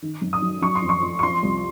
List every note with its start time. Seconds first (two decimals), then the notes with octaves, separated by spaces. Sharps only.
0.02 D#3
0.22 F#2
0.33 D#6
0.42 F#3
0.62 F#3 C#6
0.75 C6
0.82 F2
0.89 C#6
1.02 F2
1.19 C#6
1.23 F3 C6
1.43 C2